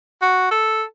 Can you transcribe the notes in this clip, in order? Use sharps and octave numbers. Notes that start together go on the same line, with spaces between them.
F#4
A4